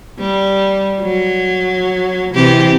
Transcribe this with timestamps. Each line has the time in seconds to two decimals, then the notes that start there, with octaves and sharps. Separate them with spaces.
0.19 G3
1.01 F#3
2.34 C3 E3 G4